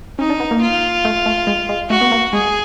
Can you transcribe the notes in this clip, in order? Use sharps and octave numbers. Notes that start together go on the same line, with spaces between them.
C#4 D#4
D4
B3
A#3
F4
A3
A3
G#3
G#3
A3 F#4
B3
A#3
G#3 G#4